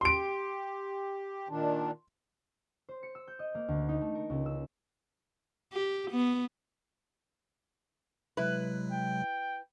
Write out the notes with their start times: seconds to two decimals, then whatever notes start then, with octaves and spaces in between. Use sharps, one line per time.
0.01 G4 C6 D7
1.49 A#2 D#3 D4
2.89 C5
3.03 C#7
3.15 E6
3.28 G6
3.39 D#5
3.55 A#3
3.68 D2
3.89 D#4
4.01 A3
4.15 A#4
4.30 C#2
4.46 E6
5.73 G4
6.11 B3
8.37 C3 F#3 G#3 E4 B4
8.92 G5